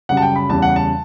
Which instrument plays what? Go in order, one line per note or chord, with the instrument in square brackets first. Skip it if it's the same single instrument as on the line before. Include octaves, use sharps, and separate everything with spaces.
[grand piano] F#2 C#3 G3 F#5
A5
G5
B5
E2 C#3 G3 A5
F#5
A5